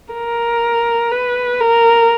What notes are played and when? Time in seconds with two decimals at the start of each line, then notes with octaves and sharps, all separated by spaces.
0.13 A#4
1.11 B4
1.60 A#4